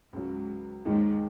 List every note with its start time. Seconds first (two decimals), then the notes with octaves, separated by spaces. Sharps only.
0.12 C#2 G#2 C#3 F#3
0.85 D#2 G#2 D#3 G#3 D#4